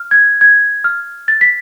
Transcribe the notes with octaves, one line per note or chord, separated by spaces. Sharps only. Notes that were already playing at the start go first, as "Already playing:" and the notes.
Already playing: F6
G#6
G#6
F6
A6
B6